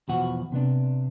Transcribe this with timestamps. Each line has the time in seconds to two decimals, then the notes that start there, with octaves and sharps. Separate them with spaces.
0.09 E2 B2 F3 F#4 F#5
0.52 C3 B3 D4